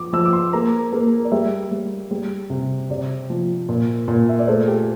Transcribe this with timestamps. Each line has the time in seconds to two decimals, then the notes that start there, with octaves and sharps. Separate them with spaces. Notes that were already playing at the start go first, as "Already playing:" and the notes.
Already playing: F3 D6
0.13 F3 E6
0.25 D6
0.33 C6
0.53 A#3 A#5
0.93 A#3
1.24 D5
1.32 G3 E5
1.71 G3
2.11 G3
2.50 C3
2.90 C3 D5
3.30 F3
3.69 A#2
4.08 A#2
4.29 E5
4.39 D5
4.48 A3 C5
4.67 G4